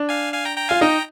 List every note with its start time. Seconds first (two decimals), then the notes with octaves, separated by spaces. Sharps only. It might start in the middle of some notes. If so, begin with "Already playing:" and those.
Already playing: D4
0.09 F5 G#5
0.33 F5 G#5
0.45 G5 A#5
0.57 G5 A#5
0.69 F4 F5 G#5
0.81 D#4 G5 A#5